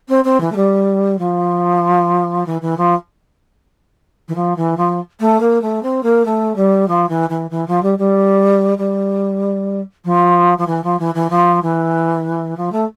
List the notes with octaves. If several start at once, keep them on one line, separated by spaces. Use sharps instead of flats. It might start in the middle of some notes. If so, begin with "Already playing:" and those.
C4
C4
E3
A3
G3
F3
E3
E3
F3
E3
F3
E3
F3
A3
A#3
A3
C4
A#3
A3
G3
F3
E3
E3
E3
F3
G3
G3
G3
F3
F3
E3
F3
E3
E3
F3
E3
F3
A3